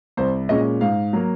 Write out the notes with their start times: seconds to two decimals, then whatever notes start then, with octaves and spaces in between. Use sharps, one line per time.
0.17 C2 C5
0.49 A#2 G#3 C#4 D#5
0.81 G#2 F5
1.13 F#3 A#3